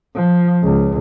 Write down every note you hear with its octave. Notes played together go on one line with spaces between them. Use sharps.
F3
C#2